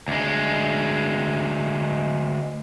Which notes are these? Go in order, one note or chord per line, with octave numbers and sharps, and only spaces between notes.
D2 G#3